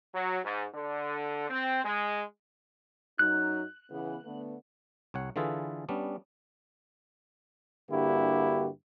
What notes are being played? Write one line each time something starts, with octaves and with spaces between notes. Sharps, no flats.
F#3
G#2
D3
C4
G#3
F#2 F#3 D#4 F#6
C#3 E3 B3
D3 A3 B3
C2 C#5 F#5
D3 E3 F4 G#4 A4 B4
G3 B3 C#4 D4
G2 D3 A#3 E4 F#4 G4